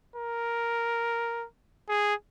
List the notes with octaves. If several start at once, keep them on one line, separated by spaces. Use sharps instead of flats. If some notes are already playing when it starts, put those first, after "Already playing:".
A#4
G#4